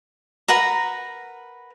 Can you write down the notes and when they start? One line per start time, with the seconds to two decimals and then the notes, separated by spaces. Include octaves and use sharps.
0.48 A#4 B4 F#5 A#5